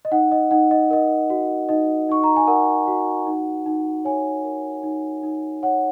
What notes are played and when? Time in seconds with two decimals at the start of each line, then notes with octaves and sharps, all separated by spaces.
0.05 D#5
0.11 D#4 F#5
0.32 D#5
0.51 D#4 F#5
0.71 D#5
0.90 A#4 D#5
1.30 F#4
1.69 D#4 D#5
2.09 D#4 C#6
2.24 A#5
2.36 G#5
2.47 A#4 F#5
2.87 F#4
3.26 D#4
3.66 D#4
4.05 C#5 G#5
4.45 A#4
4.83 D#4
5.23 D#4
5.63 C#5 F#5